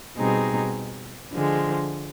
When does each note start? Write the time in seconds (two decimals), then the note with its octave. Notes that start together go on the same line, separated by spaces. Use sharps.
0.16 B2 G3 C4 D#4 G#4
1.31 D3 F3 G#3